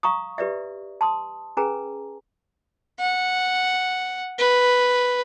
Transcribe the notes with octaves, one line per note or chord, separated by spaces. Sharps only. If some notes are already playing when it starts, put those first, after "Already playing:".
F5 A#5 C#6 D#6
G4 B4 D5 E5
A5 C6 D#6
C#4 G#4 B4 G#5 A#5
F#5
B4